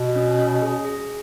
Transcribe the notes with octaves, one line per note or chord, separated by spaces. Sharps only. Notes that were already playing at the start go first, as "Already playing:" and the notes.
Already playing: B2
C#4
C#4
G#4
G#4